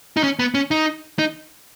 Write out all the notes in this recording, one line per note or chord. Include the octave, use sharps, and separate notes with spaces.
D#4
C#4
B3
C#4
D#4
D#4